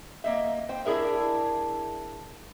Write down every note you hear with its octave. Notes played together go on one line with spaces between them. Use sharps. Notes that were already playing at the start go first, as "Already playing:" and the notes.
A#3 D#5 E5
C5 G5
D4 E4 G#4 A#4 E5